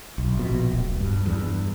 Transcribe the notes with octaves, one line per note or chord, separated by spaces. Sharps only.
B1
A#1 B2
D1
G2
E2 G2